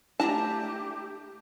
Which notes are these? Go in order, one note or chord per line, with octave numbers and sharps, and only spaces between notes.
A3 D4 E4 G4 A5 A#5